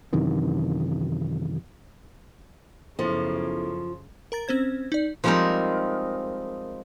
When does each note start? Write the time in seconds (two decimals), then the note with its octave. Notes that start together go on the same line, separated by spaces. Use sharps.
0.13 F#2 C3 D#3 E3
2.99 F#2 C#3 F3 B3 E4 A4
4.32 A#4 A#5 A6
4.48 C4 C#4 C5 G#6
4.92 D#4 D5
5.24 F3 G3 G#3 C4 D#4 A#4